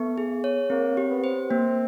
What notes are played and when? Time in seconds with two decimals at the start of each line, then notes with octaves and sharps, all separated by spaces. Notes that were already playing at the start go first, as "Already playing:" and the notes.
Already playing: A3 B3
0.18 G#4
0.44 C#5
0.70 A#3 C4
0.97 G4
1.10 B3
1.24 C5
1.50 A#3 C4